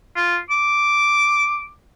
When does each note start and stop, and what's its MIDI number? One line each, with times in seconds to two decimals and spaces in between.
0.16 0.37 65
0.50 1.68 86